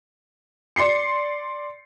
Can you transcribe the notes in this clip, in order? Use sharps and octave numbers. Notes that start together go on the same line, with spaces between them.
D5 C6 C7 C#7